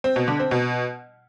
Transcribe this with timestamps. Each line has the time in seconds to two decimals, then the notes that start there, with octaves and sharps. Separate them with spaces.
0.04 C4
0.16 B2
0.28 D3
0.39 C4
0.51 B2